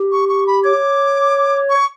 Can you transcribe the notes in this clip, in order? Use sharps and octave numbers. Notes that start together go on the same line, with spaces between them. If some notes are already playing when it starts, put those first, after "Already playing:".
Already playing: G4
C#6
C#6
B5
C#5 D6
C#6